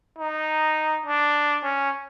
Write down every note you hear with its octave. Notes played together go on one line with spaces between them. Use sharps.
D#4
D4
C#4